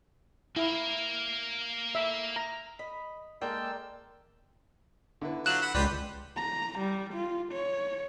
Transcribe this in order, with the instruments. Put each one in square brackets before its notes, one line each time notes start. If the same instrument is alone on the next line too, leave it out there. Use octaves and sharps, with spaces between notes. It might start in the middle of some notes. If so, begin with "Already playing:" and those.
[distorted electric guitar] A#3 A#4 [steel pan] E4
[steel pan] E5
A#5
[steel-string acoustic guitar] D#5 [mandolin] B5
[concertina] G#3 A5 E6 [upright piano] A#3 [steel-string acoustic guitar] A#4 D5 [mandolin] G5
[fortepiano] D3 E4 B4
[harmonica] F#3 F4 [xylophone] F#6 E7 F#7
[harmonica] F#5 B5
[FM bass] C#2 [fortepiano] F3 [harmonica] G4 B4 C5 [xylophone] D5
[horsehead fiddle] A#5
G3
F4
C#5